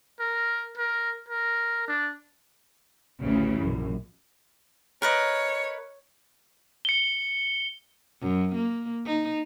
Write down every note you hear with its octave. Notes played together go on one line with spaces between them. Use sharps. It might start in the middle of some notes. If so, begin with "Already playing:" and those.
A#4
A#4
A#4
D4
A1 D2 C#3 E3
A#1 F#2
A#4 B4 C#5 D#5
C#7 G7
F#2
A#3
D#4